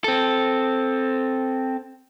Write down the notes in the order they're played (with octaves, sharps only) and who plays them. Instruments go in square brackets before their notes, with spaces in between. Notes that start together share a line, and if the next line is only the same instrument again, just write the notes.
[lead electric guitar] C4 A4